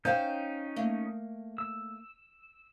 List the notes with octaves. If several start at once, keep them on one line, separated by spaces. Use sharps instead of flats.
C#4 D#4 C5 F5 G5 G6
A3 A#3
E6